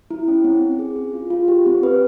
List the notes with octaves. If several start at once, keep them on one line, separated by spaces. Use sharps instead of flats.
E4
C#4
C4
C4
G#4
G#4
F4
F4
G4
C4
B4